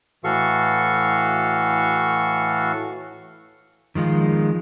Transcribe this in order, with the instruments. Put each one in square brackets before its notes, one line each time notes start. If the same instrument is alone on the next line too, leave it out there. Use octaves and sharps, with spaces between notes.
[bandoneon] A2 E3 F#4 A4 F5 C#6
[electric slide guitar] D#3 F3 G#3 F4